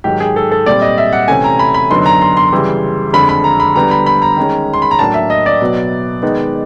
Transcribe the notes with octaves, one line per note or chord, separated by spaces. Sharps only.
G#2 D#3 F#3 G4
G#4
A4
A4
A#2 G3 C4 D5
D#5
E5
F#5
C3 E3 A3 C#4 G#5
A#5
B5
B5
F#2 D3 F#3 B3 D#4 C6
A#5
C6
C6
C#3 E3 G3
F2 D3 F3 G#3 B5
B5
A#5
B5
D3 G3 B3 A#5
B5
B5
A#5
D#3 G#3 C#4
C6
B5
A#5
A2 F#3 A#3 D4 A5
E5
D#5
D5
B2 F#3 B3
D#3 G#3 B3 D#4